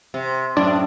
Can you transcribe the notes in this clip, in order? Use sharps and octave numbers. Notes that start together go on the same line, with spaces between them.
C3
F#2 A2 D4